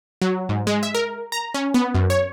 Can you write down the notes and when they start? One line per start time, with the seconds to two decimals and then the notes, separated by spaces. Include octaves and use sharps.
0.22 F#3
0.49 G#2
0.67 G#3
0.83 E5
0.95 A#4
1.32 A#5
1.54 C#4
1.74 B3
1.95 F#2
2.10 C#5